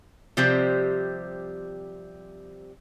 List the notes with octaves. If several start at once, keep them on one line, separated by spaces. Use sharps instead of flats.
C3 F3 G3 C4 G4 C5